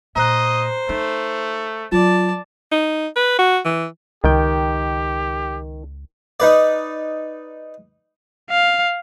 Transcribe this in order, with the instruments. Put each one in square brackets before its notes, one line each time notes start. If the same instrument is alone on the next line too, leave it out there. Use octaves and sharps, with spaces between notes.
[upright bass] A#2 [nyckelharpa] C5 [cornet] D#5 [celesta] A#5 F#6
[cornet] A3 [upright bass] D#4
[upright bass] F#3 [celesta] F4 [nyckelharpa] D5 A5
[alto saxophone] D#4
B4
F#4
E3
[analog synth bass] C#2 [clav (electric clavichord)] D#3 G5 [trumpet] G4
[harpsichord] D#4 B4 D5
[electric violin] F5